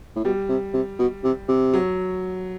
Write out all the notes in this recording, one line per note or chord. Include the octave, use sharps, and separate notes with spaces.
A2
B2 G3
C3
C3
B2
C3
C3
F#3